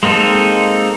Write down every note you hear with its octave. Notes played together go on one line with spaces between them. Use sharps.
G#3 A#3 C4 D#4 A4